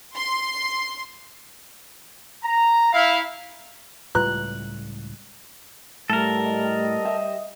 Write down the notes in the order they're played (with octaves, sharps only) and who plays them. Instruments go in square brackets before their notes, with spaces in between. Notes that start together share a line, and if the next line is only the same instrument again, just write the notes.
[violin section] C6
[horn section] A#5
E4 F5
[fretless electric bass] C#2 A2 G3 [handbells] F4 B4 A#5 [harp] F#6
[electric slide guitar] A2 [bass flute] G3 [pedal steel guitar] A4 A#4
[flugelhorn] D#5
[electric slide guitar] G4 E5